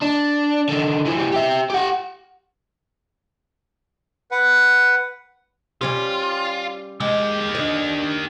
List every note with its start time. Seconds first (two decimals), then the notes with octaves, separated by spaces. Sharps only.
0.02 D4
0.69 D3 D#3
1.05 E3 F3
1.17 E3 G3
1.32 G4 E5
1.70 G4 F#5
4.31 B4 F#5
5.81 G3 C#4 F4 G4
7.00 D#3 G#3 G4
7.55 D4 D#5